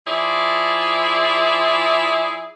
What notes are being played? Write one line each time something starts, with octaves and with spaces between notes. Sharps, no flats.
F3 E4 G#4 D5